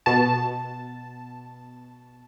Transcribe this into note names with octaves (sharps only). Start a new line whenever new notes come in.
B2 A5